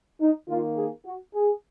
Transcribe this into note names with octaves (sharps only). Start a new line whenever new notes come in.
D#4
D#3 A#3 F4
G#4
F#4
G#4